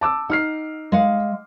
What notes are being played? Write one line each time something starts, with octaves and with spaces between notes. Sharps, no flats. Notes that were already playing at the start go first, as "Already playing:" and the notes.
A5 D6 E6
D#4 F#5 F6 C7
G#3 F5 F#5